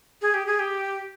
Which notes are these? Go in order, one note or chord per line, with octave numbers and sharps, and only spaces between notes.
G#4
G4
G#4
G4